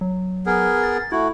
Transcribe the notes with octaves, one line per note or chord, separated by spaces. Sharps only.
F#3
B3 G#4 A#4
A6
A3 E4 F#4